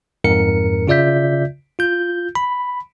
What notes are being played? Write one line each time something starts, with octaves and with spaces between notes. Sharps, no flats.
F2 G#2 A#4 C#7
C#3 F4 D5 E5 G6 B6
F4 G6
B5